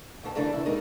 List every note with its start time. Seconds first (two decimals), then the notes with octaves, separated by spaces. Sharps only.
0.23 D2 G2 D#3 A5
0.35 C#3 E3 A3 D4 A#4
0.52 E4
0.66 G#3 D#4 A#4